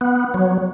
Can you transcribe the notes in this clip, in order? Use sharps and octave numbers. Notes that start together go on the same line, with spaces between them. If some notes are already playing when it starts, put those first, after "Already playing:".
B3
F#3